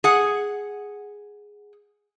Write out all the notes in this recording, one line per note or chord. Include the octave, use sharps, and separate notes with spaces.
G#4 F#5